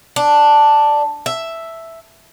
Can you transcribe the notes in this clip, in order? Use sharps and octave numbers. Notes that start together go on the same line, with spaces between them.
D4
E5